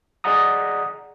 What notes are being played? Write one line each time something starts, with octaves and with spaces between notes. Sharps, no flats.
G#4 D5 D#5 F#5 A#5 D#6